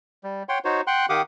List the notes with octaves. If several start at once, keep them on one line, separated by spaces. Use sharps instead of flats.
G3
C#5 F#5 G5 C6
D#4 F#4 C5 C#5
F#5 G5 C6 F#6
D#3 G4 F5 F#5 D6 D#6